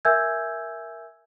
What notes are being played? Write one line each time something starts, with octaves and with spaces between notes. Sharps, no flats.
A#4 E5 G#5 E6 G6 G#6